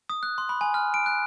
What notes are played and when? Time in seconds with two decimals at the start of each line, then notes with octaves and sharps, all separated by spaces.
0.09 D#6
0.23 F#6
0.38 C6
0.49 B5
0.61 G#5
0.74 F6
0.94 D7
1.06 F#6